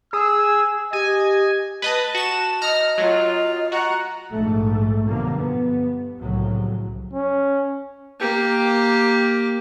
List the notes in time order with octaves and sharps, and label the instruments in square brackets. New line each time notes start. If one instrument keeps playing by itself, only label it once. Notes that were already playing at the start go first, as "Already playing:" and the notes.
[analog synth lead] G#4 [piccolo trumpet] E6 [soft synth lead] G#6
[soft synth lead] G4 [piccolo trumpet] D#5 [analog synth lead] G#5
[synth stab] B4 D#5 D#6 [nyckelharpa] A5
[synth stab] F#4 E7
[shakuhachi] D#5 [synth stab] A#5 F6
[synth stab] F#3 [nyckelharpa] F4
[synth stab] F#4 [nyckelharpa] F#5 A#5
[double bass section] A#1 G#2 A3
F#2 B2 D3 F3 G3 A#3
G2 B3
C2 A2 C#3 F3 F#3
[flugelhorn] C#4
[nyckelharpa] A#3 G4